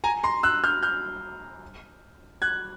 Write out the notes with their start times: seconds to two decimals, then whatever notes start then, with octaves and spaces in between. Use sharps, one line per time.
0.04 G#5 A#5
0.23 A#5 C6
0.43 E6 F#6
0.64 F6 G6
0.83 F6 G6
2.42 F#6 G#6